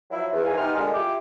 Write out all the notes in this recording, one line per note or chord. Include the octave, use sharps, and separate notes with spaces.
F3 F#3 E4
E2
C3 D#3 E3 F5 G#5
B3 D#4 G4 C6 F6
A#2 D3 G3 G#3
E4 F4 G4 D6